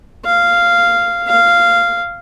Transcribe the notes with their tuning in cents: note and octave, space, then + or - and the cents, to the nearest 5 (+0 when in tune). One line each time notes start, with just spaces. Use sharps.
F5 -10
F5 -10